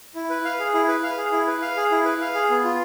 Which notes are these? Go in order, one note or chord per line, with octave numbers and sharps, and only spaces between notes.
E4
B4
F5
G#4
E4
B4
F5
G#4
E4
B4
F5
G#4
E4
B4
F5
G#4
B3
F4